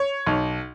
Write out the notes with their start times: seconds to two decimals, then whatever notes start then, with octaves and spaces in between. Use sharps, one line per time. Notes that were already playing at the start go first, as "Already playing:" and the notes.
Already playing: C#5
0.27 B1